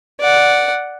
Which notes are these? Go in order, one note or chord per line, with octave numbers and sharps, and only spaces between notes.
D5 F#5